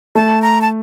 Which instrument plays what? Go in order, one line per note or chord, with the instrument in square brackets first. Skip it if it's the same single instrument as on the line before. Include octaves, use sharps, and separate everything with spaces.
[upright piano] A3 [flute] A5
[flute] A#5
A5